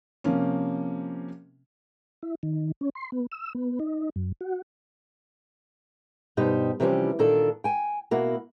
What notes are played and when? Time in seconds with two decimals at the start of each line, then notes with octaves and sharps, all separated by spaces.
0.24 C3 F3 A#3 C#4
2.23 E4
2.43 D#3
2.81 C#4
2.95 C6
3.12 B3
3.32 E6
3.55 B3
3.80 D#4
4.16 F#2
4.41 F#4
6.37 G2 B2 D#4 G4 C5
6.80 C3 E3 F3 G3 C#4 G4
7.19 A#2 D#3 D4 A4
7.64 G5 G#5
8.11 B2 A#3 E4 F#4